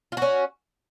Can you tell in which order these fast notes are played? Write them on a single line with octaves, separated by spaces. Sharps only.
F4 F#4 C#4